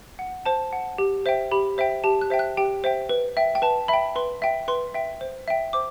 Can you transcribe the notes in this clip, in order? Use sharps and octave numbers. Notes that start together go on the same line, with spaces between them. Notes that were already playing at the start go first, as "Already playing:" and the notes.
F#5
C5 A5
F#5
G4
C5 E5 G5
G4 B5
C5 E5 G5
G4 A5
F#6
C5 E5 G5
F#6
G4 G5
C5 E5 G5
B4
E5 G5
G5
B4 A5
E5 G5 B5
B4 C6
E5 G5
B4 C6
E5 G5
C5
E5 G5
C5 D6